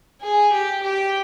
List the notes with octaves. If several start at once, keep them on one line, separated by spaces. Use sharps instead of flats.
G#4
G4
G4